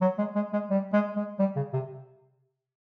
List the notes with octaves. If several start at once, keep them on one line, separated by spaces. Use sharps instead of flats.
F#3
G#3
G#3
G#3
G3
G#3
G#3
G3
C#3
C3